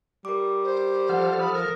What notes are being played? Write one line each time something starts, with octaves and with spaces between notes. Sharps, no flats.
G3 A#4 D6
C5
F3 A4 F#5 F6
B5 D#6
A#4